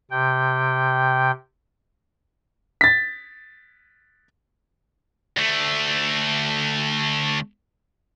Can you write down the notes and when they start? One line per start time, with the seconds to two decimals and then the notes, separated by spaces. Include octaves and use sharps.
0.11 C3 G5
2.81 A6 B6
5.37 D2 A3